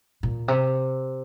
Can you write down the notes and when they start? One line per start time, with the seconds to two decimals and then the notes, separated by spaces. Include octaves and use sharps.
0.23 A#2
0.48 C3